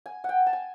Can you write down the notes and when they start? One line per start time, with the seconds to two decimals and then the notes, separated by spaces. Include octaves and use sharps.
0.06 G#5
0.24 F#5 G5
0.46 A5
0.53 G#5